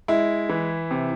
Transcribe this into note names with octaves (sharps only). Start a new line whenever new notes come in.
G#3 E4
E3
C3